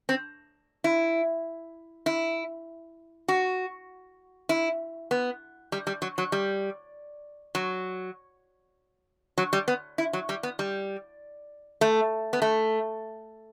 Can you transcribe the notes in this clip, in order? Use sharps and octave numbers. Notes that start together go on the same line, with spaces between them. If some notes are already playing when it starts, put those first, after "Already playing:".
C4
E4
E4
F#4
E4
B3
G3
G3
F#3
F#3
G3
F#3
F#3
G3
B3
E4
F#3
G3
B3
G3
A3
B3
A3